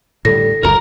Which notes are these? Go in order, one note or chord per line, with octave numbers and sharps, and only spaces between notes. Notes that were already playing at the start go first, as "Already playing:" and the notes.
A2 D3 G3 A4 A#6
F1 C#2 F#2 A#4 A#5